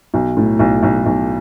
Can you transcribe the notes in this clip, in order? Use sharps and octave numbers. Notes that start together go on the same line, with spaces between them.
B1
A2
B1
B1
B1